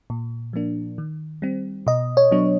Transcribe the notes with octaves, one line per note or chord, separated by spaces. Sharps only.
A#2
F3 A#3 D4
D#3
G3 C4
B2 D#5
C#5
F#3 B3 D4